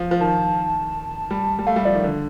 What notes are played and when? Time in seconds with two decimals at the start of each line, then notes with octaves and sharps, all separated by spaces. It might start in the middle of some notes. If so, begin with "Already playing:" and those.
Already playing: F3
0.11 F3
0.20 D#3 A5
1.31 G3
1.59 G3
1.67 A3 F5
1.76 G3
1.85 F3 D5
1.95 D#3
2.04 D3